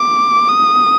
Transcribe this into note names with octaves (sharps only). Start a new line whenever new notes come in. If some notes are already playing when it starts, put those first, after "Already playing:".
Already playing: D6
D#6